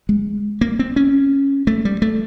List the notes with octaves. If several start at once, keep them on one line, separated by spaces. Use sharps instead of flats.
G#3
A#3
C4
C#4
A3
G3
A3